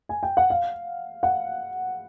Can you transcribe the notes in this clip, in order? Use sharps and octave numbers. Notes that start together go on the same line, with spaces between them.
G#5
G5
F#5
F5
F#5